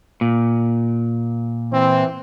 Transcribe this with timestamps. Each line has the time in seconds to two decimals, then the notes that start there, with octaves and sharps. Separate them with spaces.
0.21 A#2
1.72 E3 C4